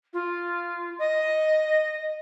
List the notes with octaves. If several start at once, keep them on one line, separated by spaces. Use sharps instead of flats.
F4
D#5